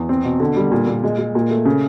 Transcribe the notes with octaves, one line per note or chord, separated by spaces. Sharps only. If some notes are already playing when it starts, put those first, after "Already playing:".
Already playing: E2
C4
B2
D3
G3
A#2
A#2
G#3
G#3
A#2
A3
C#3